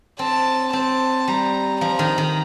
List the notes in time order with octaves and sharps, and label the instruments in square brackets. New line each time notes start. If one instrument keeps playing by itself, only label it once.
[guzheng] C4 [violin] A5
[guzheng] C4 [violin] A5
[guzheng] G3 [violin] A#5
[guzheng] F3 [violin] A#5
[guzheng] D#3
D#3